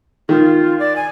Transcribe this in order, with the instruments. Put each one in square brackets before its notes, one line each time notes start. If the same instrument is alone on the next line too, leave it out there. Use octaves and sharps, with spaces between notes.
[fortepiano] D#3 [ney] F4
[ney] D5
G#5